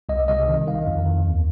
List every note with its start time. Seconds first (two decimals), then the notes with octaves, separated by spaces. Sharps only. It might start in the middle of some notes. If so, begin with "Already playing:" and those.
0.09 C2 D#5
0.28 C2 D#5
0.48 D#3
0.67 D#3 F5
0.87 F2
1.05 D#3
1.25 D#2